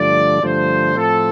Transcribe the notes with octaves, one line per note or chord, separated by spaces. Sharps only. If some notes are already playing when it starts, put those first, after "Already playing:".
Already playing: G2 D3 F3 A3 D5
G2 D3 F3 A3 C5
A2 F3 C4 A4